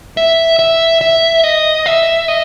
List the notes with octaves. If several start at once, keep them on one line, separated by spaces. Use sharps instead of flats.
E5
E5
E5
D#5
E5
D#5